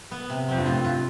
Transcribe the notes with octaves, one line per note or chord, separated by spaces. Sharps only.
B3
C3
F2 C4
G2
A2 F4
G2 F4